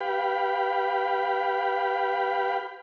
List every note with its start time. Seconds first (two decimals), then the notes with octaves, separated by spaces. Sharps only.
0.01 G4 B4 F5 G5 B5